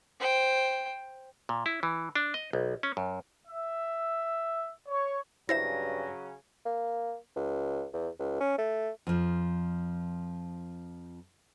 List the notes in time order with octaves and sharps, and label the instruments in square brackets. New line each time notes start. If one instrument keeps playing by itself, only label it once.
[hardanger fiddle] C5 G5
[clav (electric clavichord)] A#2
E4
E3
D4
D#5
B1
C#4
F#2
[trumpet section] E5
C#5
[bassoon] G2 [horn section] C#3 F#3 C#4 [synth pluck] E4 C5 E5 [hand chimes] A#6
[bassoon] A#3
C#2
E2
C#2
C#4
A3
[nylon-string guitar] F2 F3